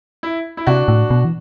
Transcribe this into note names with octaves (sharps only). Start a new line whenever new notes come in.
E4
E4
C3 D4 F#4
A2
B2
E3